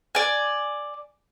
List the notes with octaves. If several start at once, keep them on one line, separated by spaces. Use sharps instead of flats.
D5 G#5